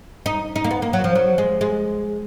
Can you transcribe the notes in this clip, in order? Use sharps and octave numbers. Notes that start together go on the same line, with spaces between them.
D#4
D#4
A#3
B3
A#3
F#3
F3
F#3
G#3
G#3